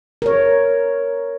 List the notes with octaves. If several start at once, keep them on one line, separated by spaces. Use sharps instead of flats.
A#4 C#5